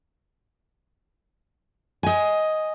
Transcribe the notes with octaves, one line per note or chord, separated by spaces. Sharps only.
D#5 G#5